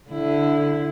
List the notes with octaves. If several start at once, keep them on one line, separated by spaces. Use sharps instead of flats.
D3 E4